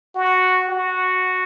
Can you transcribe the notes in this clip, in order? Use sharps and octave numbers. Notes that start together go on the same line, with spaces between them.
F#4
F#4